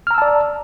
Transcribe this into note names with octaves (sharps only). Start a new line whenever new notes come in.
D5 A5 A#5 E6 F6